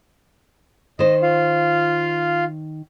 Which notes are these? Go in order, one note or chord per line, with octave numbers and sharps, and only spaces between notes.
D#3 C5 D#5
F4 F5